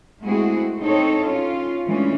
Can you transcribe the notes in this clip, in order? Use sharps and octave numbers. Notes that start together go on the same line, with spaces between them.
G#3 A3 C4 E4 F#4 G#4
C4 D#4 A4 C#5
C#4 F4
E3 G#3 A3 C#4 D4